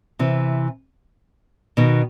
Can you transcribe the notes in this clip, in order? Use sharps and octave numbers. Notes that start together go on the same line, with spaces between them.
C3 E3
B2 D#3